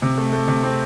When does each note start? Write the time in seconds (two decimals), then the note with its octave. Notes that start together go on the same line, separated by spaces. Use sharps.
0.02 C3
0.18 A3
0.33 A3
0.48 C3
0.63 C4